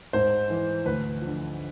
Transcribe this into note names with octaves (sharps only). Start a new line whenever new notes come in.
G#2 C5
E3
D2 B4
D3 F3